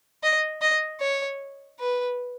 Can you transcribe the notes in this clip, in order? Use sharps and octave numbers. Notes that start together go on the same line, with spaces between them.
D#5
D#5
C#5
B4